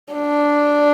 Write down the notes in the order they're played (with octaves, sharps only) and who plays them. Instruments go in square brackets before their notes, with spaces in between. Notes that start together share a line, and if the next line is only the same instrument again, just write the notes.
[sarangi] D4